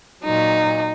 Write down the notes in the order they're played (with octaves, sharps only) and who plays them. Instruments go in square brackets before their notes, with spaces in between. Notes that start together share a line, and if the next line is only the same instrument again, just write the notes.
[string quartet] A#2 F#3 D#4